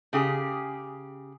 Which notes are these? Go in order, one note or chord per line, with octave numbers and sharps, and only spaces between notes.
C#3 G4 G#4